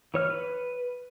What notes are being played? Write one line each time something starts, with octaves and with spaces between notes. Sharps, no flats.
E3 C#5 F6
B4